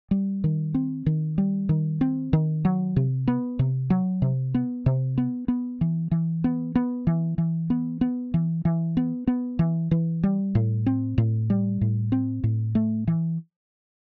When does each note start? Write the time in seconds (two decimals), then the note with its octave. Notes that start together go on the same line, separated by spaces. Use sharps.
0.11 G3
0.44 D#3
0.74 C4
1.06 D#3
1.38 G3
1.69 D#3
2.01 C4
2.33 D#3
2.65 F#3
2.96 C3
3.28 B3
3.59 C3
3.90 F#3
4.22 C3
4.54 B3
4.86 C3
5.18 B3
5.48 B3
5.81 E3
6.11 E3
6.44 B3
6.75 B3
7.07 E3
7.38 E3
7.70 B3
8.01 B3
8.34 E3
8.65 E3
8.97 B3
9.27 B3
9.59 E3
9.91 E3
10.23 G3
10.55 A2
10.86 C4
11.18 A2
11.50 G3
11.81 A2
12.12 C4
12.44 A2
12.75 A3
13.08 E3